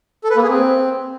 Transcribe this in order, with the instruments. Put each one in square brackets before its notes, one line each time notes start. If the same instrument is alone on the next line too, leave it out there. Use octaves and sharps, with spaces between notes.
[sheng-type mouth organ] A4
B4
A#3
G#4
C4